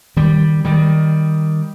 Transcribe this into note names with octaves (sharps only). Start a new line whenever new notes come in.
D#3 G3
D#3 G3